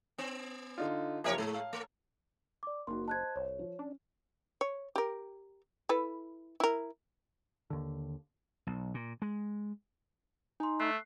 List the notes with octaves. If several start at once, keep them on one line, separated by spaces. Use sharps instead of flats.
B3
D3 D#4 F4
F#1 F3 G4 A#4 C#5 E5
A2 G#3
F5
A3
D5 D6
F#1 A#3 D#4 F#4 C6
C5 D#5 A5 F#6 G#6
C2 C#5
F3
C#4 D4
C#5
G4 A#4
E4 A4 B4
E4 A#4
D#2 D3
B1
A#2
G#3
D#4 G#5 C6
A3 F#6 C7